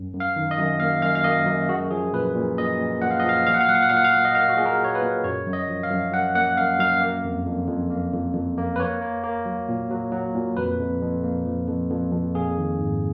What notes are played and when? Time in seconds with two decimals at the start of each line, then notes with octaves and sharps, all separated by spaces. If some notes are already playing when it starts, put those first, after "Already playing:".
Already playing: F#2
0.13 F#2
0.20 F5
0.36 D#3
0.51 D#5
0.58 F#2
0.80 A#3 F5
1.02 F#2 F5
1.15 F5
1.24 A#3 D#5
1.46 F#2
1.68 G#3 F#4
1.91 F3 G#4
2.13 A#2 B4
2.36 A#2
2.58 A#2 D#5
2.79 A#2
3.02 A#2 F#5
3.11 F5
3.20 D#5
3.24 F3
3.29 F5
3.47 A#2 F5
3.54 F#5
3.61 F5
3.68 F#3 F#5
3.75 F5
3.82 F#5
3.89 A#2 F5
3.97 F#5
4.05 F5
4.13 A#3
4.25 D#5
4.35 A#3 F5
4.49 F#4
4.57 A#2 G#4
4.66 A#4
4.80 A#2 C#5
4.95 B4
5.02 A#2
5.24 F#2 C#5
5.46 F#2
5.53 D#5
5.68 F3
5.83 F5
5.91 F#2
6.13 F#2 F#5
6.35 A#3 F#5
6.57 F#2 F5
6.79 F#2 F5
7.01 A#3
7.25 F2
7.47 F2
7.68 F2
7.91 A#3
8.13 F2
8.35 F2
8.58 A#3
8.76 B4
8.80 A#3 C#5
9.01 A#3
9.24 A#3
9.46 F#3
9.69 A#2
9.91 F#3
10.12 F#3
10.35 A#2
10.57 F2 B4
10.80 F2
11.01 F2
11.24 A#3
11.46 F3
11.68 F2
11.91 F2
12.12 F2
12.35 A#3 G#4
12.57 D#3
12.78 G#2